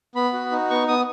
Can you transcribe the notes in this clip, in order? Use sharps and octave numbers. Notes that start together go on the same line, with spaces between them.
B3 B5
F#4
D#4
B3 C#6
B3 D#6